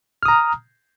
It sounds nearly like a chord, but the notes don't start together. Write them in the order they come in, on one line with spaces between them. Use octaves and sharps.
F6 D#6 A#5